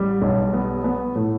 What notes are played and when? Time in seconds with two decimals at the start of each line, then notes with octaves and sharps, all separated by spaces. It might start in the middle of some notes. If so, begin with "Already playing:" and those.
Already playing: A1 G3
0.22 B1
0.53 B3
0.84 B3
1.16 A2